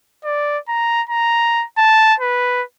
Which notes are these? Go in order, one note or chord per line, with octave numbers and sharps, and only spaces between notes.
D5
A#5
A#5
A5
B4